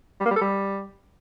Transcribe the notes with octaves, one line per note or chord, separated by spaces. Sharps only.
G3
A#3
G3
A4
G3